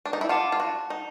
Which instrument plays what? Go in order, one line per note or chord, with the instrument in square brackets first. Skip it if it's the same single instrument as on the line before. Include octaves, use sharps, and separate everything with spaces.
[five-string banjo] D4
D#4
E4
[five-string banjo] F4 [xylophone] F#5 A5 D6
[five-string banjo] F4
F#4
D#4